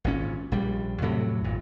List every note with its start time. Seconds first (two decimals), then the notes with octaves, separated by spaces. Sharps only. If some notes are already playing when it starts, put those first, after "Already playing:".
0.04 G#1 A#2 C#4
0.52 A#1 G3
1.01 F2 A2 C3 F#3
1.44 G#1 A#2